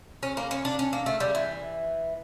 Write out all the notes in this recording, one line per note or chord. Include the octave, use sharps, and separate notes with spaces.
C#4
A#3
C#4
D4
C#4
A#3
A3
G3
E3